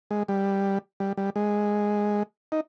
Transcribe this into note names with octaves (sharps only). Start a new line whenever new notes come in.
G#3
G3
G3
G3
G#3
D#4